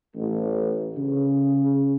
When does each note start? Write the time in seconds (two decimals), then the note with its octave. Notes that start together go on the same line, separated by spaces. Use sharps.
0.16 A1
0.97 C#3